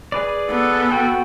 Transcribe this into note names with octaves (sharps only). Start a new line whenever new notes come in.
G#4 B4 D5
B3 A4
F#4 G5